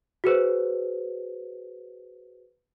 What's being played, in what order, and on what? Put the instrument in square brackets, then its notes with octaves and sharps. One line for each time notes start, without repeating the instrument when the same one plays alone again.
[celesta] F#4 G#4 B4 C5